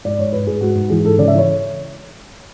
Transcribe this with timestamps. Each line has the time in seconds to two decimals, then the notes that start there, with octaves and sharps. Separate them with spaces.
0.04 G#2 D5
0.18 G#2 C#5
0.32 G#2 B4
0.47 G#2 G#4
0.61 G#2 F#4
0.75 G#2
0.90 E3 G#4
1.04 G#2 A4
1.18 C#3 D5
1.28 E5
1.33 E3
1.38 C#5